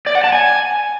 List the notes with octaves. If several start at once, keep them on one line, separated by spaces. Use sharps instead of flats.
D5
F#5
A5
G#5